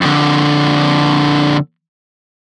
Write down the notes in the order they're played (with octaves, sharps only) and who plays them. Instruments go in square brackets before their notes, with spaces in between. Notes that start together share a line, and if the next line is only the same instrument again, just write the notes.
[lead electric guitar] F2 D3